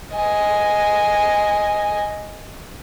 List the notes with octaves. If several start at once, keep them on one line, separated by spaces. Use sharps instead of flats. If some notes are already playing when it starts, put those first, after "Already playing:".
D#5 G#5